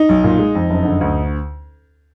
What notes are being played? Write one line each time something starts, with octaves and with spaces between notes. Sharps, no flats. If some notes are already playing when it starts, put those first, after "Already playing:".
Already playing: D#4
B1
A#2
G#3
F2
F#1
D3
D2